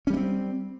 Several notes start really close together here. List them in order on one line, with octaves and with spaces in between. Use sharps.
C#4 G3 A3 C4